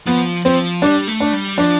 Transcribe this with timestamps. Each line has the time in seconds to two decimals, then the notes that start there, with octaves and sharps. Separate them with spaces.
0.06 F3 B3
0.45 F3 C4
0.82 G3 D4
1.07 A3
1.20 D4
1.33 G3
1.57 F3 D4